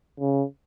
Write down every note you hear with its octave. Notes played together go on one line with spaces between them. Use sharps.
C#3